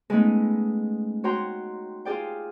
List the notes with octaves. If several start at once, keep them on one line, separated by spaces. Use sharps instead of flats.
G#3 A3 B3 C#4 D#4
F#4 C#5 G5 A#5 C6
F4 G4 G#4 D5 G5